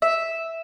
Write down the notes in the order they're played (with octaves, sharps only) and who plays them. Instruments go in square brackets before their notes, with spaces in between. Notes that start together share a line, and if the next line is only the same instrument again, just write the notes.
[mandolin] E5